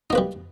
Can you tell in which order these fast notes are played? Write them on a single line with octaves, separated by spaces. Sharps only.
D#4 A#3 B4 G3